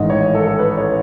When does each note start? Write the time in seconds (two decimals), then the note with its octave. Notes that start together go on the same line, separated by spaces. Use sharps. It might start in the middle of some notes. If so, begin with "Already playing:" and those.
Already playing: A1 G#2 D#3 D#5
0.10 C#5
0.35 A4
0.47 A4
0.59 B4
0.72 B4
0.77 C#5